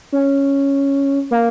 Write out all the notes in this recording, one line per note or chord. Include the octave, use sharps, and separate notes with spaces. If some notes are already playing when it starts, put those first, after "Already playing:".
C#4
A#3